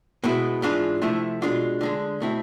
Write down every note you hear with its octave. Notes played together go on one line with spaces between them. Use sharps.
B2 G#3 B3 E4
G#2 E3 G#3 D4 F4
C3 F3 A3 E4
B2 G#3 D4 F4
D3 G#3 D4
B2 A3 C4 E4